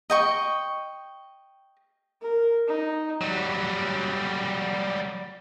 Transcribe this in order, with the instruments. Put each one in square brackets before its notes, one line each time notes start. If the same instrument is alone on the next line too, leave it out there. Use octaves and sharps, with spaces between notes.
[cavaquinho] D#5 G5 C#6
[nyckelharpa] A#4
D#4
[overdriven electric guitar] F#3 G3